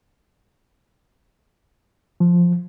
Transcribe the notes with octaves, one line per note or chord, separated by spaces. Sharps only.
F3